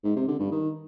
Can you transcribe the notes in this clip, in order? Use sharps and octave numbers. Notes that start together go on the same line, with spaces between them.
G#2
C3
D3
G2
D#3